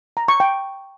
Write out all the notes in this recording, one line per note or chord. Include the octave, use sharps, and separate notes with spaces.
A#5
C#6
G5